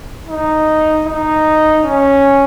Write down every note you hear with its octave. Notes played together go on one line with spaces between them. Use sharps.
D#4
D#4
C#4